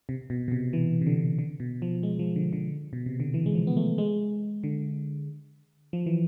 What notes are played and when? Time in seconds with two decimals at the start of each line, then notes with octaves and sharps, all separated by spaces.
0.09 C3
0.30 B2
0.48 B2
0.52 C3
0.73 E3
1.01 C3
1.07 D3
1.39 D3
1.60 B2
1.82 F3
2.03 G#3
2.19 F3
2.36 D3
2.53 D3
2.93 B2
3.06 C3
3.20 D3
3.34 E3
3.46 G#3
3.55 F3
3.67 B3
3.77 A3
3.98 G#3
4.64 D3
5.93 F3
6.06 E3